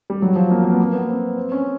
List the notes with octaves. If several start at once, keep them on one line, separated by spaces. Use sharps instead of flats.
G3
F#3
F3
A#3
A#3
B3
A#3
B3
C4
C4
C#4